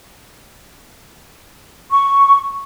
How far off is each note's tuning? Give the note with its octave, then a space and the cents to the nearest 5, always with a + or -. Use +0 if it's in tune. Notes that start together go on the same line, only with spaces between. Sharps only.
C#6 +0